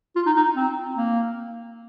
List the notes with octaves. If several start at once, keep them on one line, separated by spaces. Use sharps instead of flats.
F4
D#4
D#4
C4
A#3